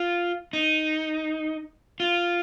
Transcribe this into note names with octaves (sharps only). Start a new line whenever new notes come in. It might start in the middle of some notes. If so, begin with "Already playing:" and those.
Already playing: F4
D#4
F4